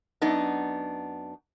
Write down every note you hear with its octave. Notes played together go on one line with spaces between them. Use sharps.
F#2 B3 D4 D#4